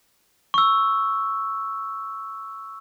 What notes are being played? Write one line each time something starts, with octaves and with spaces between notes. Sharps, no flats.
C#6 E6